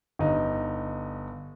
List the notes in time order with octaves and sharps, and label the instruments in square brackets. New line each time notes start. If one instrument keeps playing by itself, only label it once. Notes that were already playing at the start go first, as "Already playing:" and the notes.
[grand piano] G1 D#4